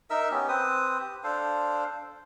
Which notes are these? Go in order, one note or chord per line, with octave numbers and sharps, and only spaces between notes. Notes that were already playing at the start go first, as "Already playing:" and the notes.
D#4 A#4 E5 E6
B3 C#4 G4
C4 B4 C5 D#6
G4
D4 A4 C5 F5